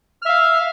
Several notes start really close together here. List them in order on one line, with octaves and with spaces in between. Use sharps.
F6 E5 F5